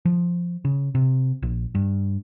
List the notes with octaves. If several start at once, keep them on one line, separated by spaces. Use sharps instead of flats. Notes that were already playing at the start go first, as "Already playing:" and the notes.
F3
C#3
C3
A#1
G2